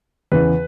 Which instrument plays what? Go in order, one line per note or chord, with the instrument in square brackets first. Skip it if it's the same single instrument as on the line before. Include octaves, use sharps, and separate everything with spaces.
[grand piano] E2 C#3 E3 B4